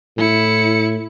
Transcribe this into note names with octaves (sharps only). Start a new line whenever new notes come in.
A2 E4 C#7